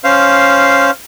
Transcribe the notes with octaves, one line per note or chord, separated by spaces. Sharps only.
C#4 C5 F5